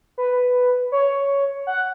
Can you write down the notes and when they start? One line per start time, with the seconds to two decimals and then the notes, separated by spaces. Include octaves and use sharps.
0.18 B4
0.92 C#5
1.67 F#5